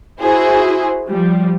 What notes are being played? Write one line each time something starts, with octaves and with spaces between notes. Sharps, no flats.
E4 F#4 G#4 C5
F3 G3